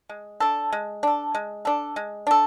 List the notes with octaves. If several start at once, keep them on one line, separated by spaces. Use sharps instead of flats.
G#3
D4 A4
G#3
D4 A4
G#3
D4 A4
G#3
D4 A4